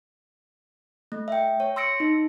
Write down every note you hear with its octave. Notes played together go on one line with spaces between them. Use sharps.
A3
E5 G5
C#5
C6 E6 A#6 C#7 D7
D#4